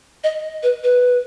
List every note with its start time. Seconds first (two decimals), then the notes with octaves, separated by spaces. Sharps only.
0.24 D#5
0.63 B4
0.84 B4